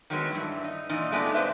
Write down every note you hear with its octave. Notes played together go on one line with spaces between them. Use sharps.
D#3 F#3 G#3 B3
G2 E3
D#4
A#2 E3 D#4 F4
G#3 A3 B3 D#4 F4 D5
F2 C3 B4 C5 E5